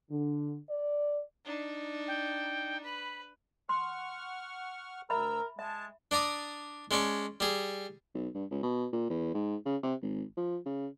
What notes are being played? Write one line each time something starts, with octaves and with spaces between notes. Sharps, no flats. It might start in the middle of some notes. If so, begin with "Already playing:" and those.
D3
D5
D4 D#4
G5
B4 B5
F#5 C6 C#6 F6
D2 A#4 E5 A#5 B5 E6
G#3 E5 A5
D4 D5 A#5 D6 D#6
G#3 C#4 D5 A5 C#6
G3 G#4
B1
G2
C#2
B2
A#2
E2
G#2
C#3
C3
G#1
F3
C#3